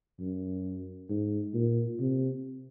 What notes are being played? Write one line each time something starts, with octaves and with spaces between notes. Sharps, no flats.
F#2
G#2
A#2
C3